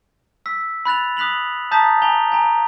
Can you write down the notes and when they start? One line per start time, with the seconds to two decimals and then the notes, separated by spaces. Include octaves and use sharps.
0.46 E6 B6
0.85 B5 F#6 A6 F7
1.17 D#6 F#6 B6 F7 F#7
1.71 A5 A#5 D#6 G6 A6 B6
2.02 G#5 A#5 F7 G7
2.32 G#5 A#5